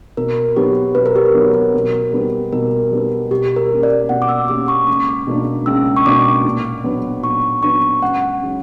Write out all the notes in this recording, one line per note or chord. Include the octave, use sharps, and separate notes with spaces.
B2 A#4
F#3 B3 G4
B2 B4
A#4
G4
A#4
F#3 B3
B2
G3 B3
B2 A#4
G3 B3
B2 G4
A#4
A#3 C#4 G4
D5
B2 F#5
D6
E6
A#3 C#4 G4 D6
C#6
C#2 D6
B2 A#3 D4
C#2 E6
C#6
B2 A#3 D4 D6
A#2
F#3 B3 D4
A#2 C#6
F#3 B3 D4 C#6
C#2 F#5
C#3 F#3